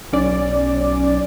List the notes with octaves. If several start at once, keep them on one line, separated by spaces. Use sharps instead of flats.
B1 C#4 D5